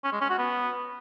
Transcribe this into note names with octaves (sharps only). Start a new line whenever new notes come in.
C#4
G#3
C#4
F#4
B3